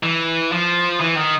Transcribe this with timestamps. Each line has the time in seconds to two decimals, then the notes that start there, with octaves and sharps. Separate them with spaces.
0.03 E3
0.52 F3
1.01 E3
1.17 D#3